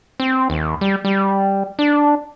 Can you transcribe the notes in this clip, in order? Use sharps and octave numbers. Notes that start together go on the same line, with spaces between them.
C4
D#2
G3
G3
D4